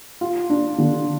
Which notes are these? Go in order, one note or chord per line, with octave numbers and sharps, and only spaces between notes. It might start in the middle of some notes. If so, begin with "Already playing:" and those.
F4
D4
D3